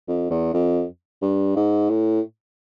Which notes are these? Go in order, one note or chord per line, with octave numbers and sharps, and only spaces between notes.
F2
E2
F2
G2
G#2
A2